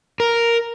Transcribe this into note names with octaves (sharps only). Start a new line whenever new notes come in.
A#4